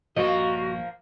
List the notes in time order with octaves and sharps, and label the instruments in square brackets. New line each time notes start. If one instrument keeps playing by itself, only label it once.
[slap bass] A#1 G2 [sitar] F3 A#3 [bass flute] F#4 [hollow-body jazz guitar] D#5